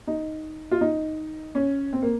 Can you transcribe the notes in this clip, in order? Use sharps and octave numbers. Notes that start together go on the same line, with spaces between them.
D#4
F4
D#4
C#4
C4
A#3